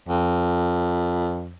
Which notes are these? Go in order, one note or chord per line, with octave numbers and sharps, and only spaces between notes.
F2